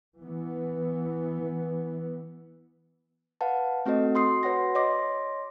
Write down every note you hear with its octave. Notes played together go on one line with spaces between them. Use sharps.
E3 B3
B4 F5 F#5 A5
A3 C4 F#4 A4 D#5
F#4 C6 D#6 C7
F#4 B4 C#5 F#5 C6 A#6
C#5 D#5 C6 D6 A#6